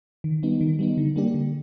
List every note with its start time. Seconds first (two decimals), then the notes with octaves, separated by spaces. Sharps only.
0.24 D#3
0.43 G3 B3 D#4
0.61 D#3
0.79 G3 B3 D#4
0.97 D3
1.16 G3 A#3 D4 G4
1.34 D3